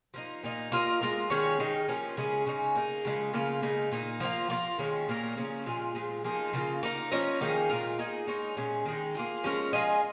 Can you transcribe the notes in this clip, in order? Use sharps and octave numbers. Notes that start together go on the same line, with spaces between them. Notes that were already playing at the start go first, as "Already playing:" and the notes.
F3 A#3 D#4
A#2 A#3 D#4
A#3 F4 A#4 D#5
G#3 F4 A#4
D#3 C#4 G#4 C#5
D#3 G#3 D#4
F3 A#3 C#4
C#3 G#3 C#4 G#4
C#3 G#3 D#4 C#5
A#3 D#4 G#4
C#3 F3 G#3 D#4
C#3 A#3 F4
C#3 G#3 D#4
A#2 A#3 D#4
F3 A#3 F4
A#3 F4 A#4
D#3 G#3 C#4
A#2 A#3 C#4 A#4
C#3 F3 C#4
A#2 G#3 F4 G#4
A#2 F3 G#3
F3 A#3 D#4 G#4
C#3 A#3 F4
A#3 D#4 A#4
F3 C#4 A#4 D#5
D#3 A#3 D#4 G#4
A#2 G#3 F4 A#4
A#3 D#4 G#4 D#5
G#3 D#4 A#4 C#5
A#2 G#3 C#4
D#3 G#3 D#4
A#3 F4 G#4
F3 G#3 C#4 A#4
G#3 F4 G#4 D#5